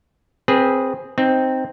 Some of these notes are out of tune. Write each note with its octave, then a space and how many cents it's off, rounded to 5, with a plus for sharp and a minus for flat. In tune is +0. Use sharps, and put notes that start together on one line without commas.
C4 +5 G#4 +0 B4 -20
C4 +0 D#4 +0